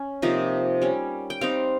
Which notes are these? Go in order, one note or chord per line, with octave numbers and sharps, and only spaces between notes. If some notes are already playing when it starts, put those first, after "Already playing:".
Already playing: C#4
C3 F3 A#3 D#4
G3 C#4
G5
G3 C4 D#4 F5